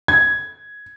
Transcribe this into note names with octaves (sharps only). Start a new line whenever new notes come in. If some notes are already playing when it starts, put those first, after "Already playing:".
G#6